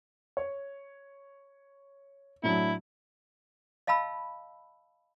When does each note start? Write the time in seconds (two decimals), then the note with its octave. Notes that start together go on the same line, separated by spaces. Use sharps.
0.37 C#5
2.43 A2 F#3 D4 E4
3.87 D#5 F5 A5 B5 E6